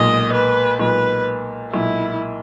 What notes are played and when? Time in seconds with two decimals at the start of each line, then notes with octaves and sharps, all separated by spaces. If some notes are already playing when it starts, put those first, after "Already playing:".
Already playing: B1 A#2 G#3 D#5
0.33 B4
0.79 B1 A#2 G#3 B4
1.73 B1 A#2 G#3 E4